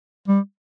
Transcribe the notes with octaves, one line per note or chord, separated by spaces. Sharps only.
G3